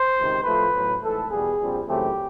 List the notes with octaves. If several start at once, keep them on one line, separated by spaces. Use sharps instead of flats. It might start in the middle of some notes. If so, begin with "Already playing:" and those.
Already playing: C5
C#2 C3 D#3
A2 F3 A3 B4
A1 A2 F#3 B3
G#1 G#2 E3 A3 A4
E2 B2 G3 B3 G#4
A#1 A#2 G3 C4
F#2 C#3 E3 A3 C4 G4